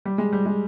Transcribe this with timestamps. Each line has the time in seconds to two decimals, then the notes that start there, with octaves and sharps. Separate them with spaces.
0.05 G3
0.18 G#3
0.33 G3
0.46 G#3